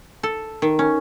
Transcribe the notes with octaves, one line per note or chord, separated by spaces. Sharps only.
A4
D#3
C#4